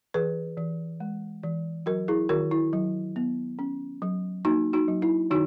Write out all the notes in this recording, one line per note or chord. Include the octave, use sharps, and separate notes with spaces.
E3 G#4 B4
E3
G#3
E3
F#3 F#4 A#4
E4 G#4
D#3 F#4 A#4
E4
F#3
B3
C#4
F#3
A#3 D#4 F#4
D#4 F#4
F#3
E4
D#3 D#4 F#4